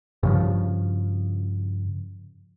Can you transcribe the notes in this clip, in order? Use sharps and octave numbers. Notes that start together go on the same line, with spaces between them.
G2 C#3 F3